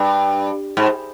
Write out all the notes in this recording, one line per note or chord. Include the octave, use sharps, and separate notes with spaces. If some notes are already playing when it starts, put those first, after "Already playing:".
Already playing: G2
G#2